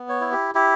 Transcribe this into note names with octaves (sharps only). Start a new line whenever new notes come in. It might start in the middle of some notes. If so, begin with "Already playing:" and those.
Already playing: B3
C#5
E4
G4
E4 G4